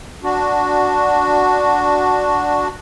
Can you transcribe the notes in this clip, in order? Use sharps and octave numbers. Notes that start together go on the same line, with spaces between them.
D4 F#4